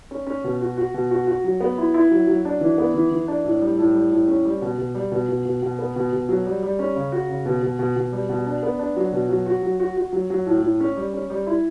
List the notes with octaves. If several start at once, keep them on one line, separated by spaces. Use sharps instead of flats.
C#4
C#4
B2
F#4
F#4
B2
F#4
F#4
F#3
B3
E4
E4
F#3
F#3
D4
E3
B3
E3
E3
D4
A2
G3
A2
G3
A2
C#4
G3
B2
B2
G3
B2
B2
B2
B2
B3
B2
B2
F#3
G3
G3
C#4
C#3
F#4
C#3
B2
B2
B2
B2
G3
B2
D4
B3
D4
F#3
B2
F#3
F#4
F#3
F#4
F#4
F#3
F#3
A2
A2
C#4
G3
C#4
G3
E4